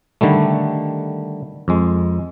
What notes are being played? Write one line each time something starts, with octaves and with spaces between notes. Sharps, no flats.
D3 D#3 G3 A3
F2 G#3